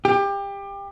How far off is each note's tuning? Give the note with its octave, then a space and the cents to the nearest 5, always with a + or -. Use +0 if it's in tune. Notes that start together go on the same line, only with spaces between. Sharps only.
G4 +25